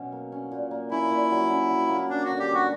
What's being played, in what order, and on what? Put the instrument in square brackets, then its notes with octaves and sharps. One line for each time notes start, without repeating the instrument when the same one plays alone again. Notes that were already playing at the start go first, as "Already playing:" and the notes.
Already playing: [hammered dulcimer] B2 F#3 C#4
A#3
C#4
A#2
A#3
[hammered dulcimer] C#4 [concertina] E4
[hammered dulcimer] A#2
F#3
C#4
F#3
A#3
[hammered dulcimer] C#4 [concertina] D4
[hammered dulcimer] D3 [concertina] F#4
[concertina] G4
[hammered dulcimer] G3
[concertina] F#4